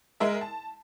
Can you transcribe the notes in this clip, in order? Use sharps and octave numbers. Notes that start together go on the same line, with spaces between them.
G#3 A#4 E5
A5